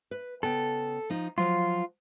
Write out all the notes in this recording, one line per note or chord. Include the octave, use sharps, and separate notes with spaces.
B4
C#3 B3 A4 G5
F3 D#4
F3 F#3 F4